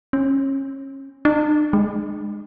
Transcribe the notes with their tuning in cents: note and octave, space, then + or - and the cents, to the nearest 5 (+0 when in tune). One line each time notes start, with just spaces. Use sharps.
C#4 -30
D4 +45
G#3 +0